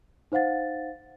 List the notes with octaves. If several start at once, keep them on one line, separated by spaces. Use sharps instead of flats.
D#4 C5 F5 F#5 A6